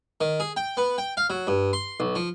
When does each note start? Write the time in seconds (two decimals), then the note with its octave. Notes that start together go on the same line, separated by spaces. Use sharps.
0.21 D#3
0.40 G#4
0.57 G5
0.77 B3
0.98 G5
1.17 F5
1.30 F#3
1.47 G2
1.73 C6
2.00 B1
2.15 F3